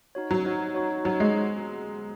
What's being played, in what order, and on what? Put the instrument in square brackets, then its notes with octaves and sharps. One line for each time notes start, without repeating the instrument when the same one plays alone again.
[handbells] D#4 F#4 C#5
[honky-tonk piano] F#3
[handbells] D#4 F#4 C#5
D#4 F#4 C#5
[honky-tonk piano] F#3 [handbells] D#4 F#4 C#5
[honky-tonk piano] G#3